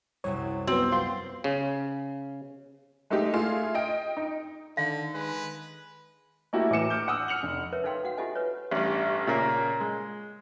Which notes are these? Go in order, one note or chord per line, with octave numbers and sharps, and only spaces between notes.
C2 F#2 C3 C#5
F#3 B3 C4
F4 A#4 D5 G5 C6
C#3
G#3 A3 D#4 G4
A3 E4 F4 G#4
D#5 G5 D7
D#4
D3 D#3 F5
G#3 B4
A3 A#3 E4 F#4 G4
A2 E3 D6 C#7 E7
D6 F6 G6
F#5 D#6 E6
F6 C#7 F7 F#7
F1
A#4 B4 C#5 E5
D#4 A4 C#5 F5 G5 C6
F#4 F5 F#5
F4 G4 A4 D#5 E5 G#5
B4 C#5
A1 G2
A#2 C#3 A#3
G#3